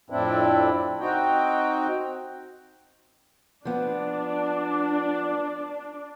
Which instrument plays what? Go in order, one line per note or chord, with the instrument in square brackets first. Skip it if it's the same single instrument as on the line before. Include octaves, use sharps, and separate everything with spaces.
[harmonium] F2 A2 C4 D4 E4
C4 D#4 F#4 G5
[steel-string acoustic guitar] F3 B3 [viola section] D4